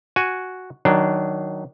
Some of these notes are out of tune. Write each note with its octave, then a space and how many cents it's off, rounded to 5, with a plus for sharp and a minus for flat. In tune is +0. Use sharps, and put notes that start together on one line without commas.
F#4 +0 G#5 +0
D#3 +0 F#3 +15 D4 +5